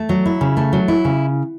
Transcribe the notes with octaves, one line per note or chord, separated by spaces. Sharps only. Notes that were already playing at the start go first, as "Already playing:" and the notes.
Already playing: A3
F#3
E4
C#3
A3
F#3
E4
C#3